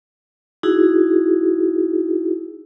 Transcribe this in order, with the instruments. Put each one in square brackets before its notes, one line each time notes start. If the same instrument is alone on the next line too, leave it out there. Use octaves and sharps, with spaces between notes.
[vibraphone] D#4 E4 F#4 G#4